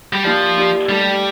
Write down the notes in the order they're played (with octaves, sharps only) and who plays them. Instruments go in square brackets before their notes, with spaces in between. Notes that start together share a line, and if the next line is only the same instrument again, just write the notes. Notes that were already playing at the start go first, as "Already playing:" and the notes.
[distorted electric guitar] G3
[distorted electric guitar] F3 [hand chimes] A#3 D#4 G4 D5
[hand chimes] A#3 D#4 G4 D5
[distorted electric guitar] G3 [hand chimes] A3 D#4 A4 D5 A5